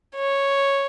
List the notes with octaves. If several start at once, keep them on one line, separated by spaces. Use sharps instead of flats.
C#5